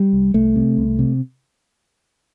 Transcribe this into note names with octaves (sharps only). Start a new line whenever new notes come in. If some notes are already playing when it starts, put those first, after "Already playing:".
Already playing: G3
C2
C2 A3
C3
C2
C3